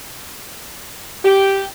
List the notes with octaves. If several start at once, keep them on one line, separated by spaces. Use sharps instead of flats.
G4